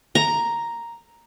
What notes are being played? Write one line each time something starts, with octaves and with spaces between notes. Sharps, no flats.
A#5